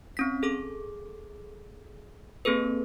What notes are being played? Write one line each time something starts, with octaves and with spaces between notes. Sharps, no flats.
C4 C#4 B6
G#4 A4 D6
A#3 C4 G#4 A4 B4